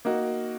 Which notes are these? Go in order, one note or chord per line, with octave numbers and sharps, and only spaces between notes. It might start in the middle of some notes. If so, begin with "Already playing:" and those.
A#3 D#4 F#4